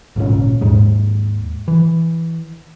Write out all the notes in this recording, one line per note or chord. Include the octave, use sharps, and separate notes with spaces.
G#1 C#2 A#2 C#4
D#2 G#2 G#3
E3